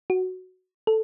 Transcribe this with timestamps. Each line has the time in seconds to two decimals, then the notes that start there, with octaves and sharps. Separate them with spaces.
0.10 F#4
0.87 A4